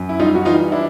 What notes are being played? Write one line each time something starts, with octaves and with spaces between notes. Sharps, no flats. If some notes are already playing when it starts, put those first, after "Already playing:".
Already playing: F#2
E4
G3 D#4 F4
F#4
E3 D#4 F4
D4 E4